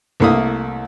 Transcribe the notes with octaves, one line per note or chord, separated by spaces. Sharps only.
C2 A3 A#3 E4 D#6